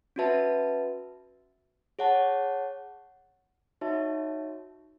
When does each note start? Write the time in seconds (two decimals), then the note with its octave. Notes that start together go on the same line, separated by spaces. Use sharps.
0.16 C#4 F#4 B4 E5 A5
1.99 G#4 C#5 F#5 A5
3.81 D#4 F#4 C#5 E5 A5